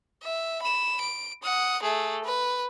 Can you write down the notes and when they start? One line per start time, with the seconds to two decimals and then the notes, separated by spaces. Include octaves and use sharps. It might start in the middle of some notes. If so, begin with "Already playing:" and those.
0.22 E5
0.62 B5 E7
1.00 D7
1.43 F#5 D#6
1.82 A3 G#4
2.24 B4